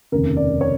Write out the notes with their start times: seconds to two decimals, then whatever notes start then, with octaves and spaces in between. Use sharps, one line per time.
0.12 F1 D#2 C#3 A#4
0.37 D5
0.61 C#5